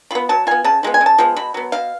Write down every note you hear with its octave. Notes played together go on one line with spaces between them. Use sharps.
B3 F4 B5
F#3 A5
B3 F4 G#5
C#3 A5
F3 G#3 B3
G#5
C#3
A5
F3 G#3 B3
B2 B5
F#3 B3
B2 F5